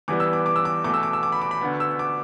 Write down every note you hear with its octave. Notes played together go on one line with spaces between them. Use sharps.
E2 E3 G3 B3 D6
E6
D6
D6
E6
D6
E2 B2 A3 D6
E6
D6
E6
D6
B5
D6
B5
D2 D3 B3
E6
D6